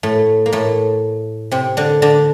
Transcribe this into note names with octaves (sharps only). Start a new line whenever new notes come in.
A2 A3
A#3
A2 A3
C3 C4
D3 D4
D3 D4